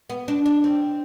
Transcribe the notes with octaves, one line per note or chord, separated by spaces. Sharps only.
B3
D4
D4
C4